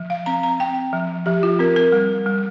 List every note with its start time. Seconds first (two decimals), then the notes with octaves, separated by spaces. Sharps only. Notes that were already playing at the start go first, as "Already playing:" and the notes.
Already playing: F3
0.10 F5
0.26 C4 A#5
0.43 A#5
0.60 C4 G5
0.93 F3
1.26 F3 G4
1.43 F4
1.59 C4 A#4
1.76 A#4
1.92 G3
2.26 G3